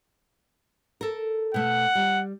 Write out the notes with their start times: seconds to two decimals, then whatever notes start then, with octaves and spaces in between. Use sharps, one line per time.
1.01 A4 A#4
1.54 B2 A3 F#5
1.95 G3